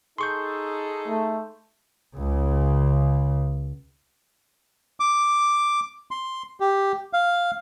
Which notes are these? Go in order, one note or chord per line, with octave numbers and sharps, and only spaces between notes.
D#4 G#4 A4 C6 C#6 G6
A3
C#2 C#3
D6
C6
G4
F5